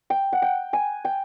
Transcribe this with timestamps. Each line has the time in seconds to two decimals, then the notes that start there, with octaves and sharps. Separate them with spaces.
0.10 G5
0.33 F#5
0.42 G5
0.73 G#5
1.05 G5